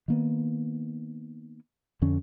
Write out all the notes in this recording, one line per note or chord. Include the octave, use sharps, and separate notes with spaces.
D#3 A#3 B3
F2 D3 C#4